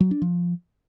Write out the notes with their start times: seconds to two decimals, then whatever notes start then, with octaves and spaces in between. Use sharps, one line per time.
0.01 F#3
0.11 D4
0.22 F3